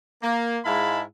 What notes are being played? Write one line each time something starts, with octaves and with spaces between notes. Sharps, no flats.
A#3
G#2 G#3 E4 F5 A5 B5